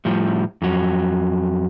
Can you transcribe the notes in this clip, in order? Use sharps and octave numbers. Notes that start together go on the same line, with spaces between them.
A2 F3 G3
F2 F#3